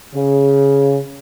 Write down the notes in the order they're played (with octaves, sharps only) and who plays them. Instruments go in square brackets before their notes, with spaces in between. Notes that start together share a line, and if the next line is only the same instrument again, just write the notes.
[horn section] C#3